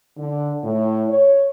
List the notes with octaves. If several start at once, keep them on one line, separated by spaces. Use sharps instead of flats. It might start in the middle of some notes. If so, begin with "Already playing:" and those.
D3
A2
C#5